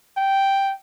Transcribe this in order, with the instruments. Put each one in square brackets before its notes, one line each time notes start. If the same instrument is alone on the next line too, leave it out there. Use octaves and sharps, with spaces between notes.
[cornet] G5